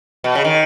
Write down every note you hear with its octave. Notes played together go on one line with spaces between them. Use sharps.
B2
C#3
D#3